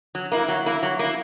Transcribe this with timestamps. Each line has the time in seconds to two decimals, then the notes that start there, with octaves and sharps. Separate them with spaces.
0.15 F#3
0.32 A#3 E4
0.48 F#3
0.66 A#3 E4
0.83 F#3
0.99 A#3 E4